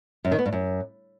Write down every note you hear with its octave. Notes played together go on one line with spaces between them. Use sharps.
F#2
D#3
B3
G2
F#2